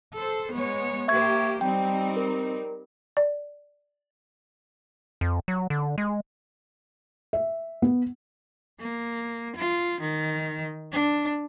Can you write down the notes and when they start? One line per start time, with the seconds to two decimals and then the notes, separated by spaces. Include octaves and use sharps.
0.15 A4 C5
0.53 G#3 B3 C#5
1.08 A#3 G4 C5 E5 C#6 G#6
1.61 G3 C4 D#4 G5
2.16 A#4
3.17 D5
5.21 F2
5.48 F#3
5.70 D3
5.98 G#3
7.33 E5
7.82 B3
8.80 A#3
9.56 F4
10.01 D#3
10.93 D4